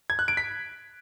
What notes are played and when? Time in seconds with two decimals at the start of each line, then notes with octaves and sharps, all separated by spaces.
0.10 G#6
0.19 F#6
0.28 D7
0.37 B6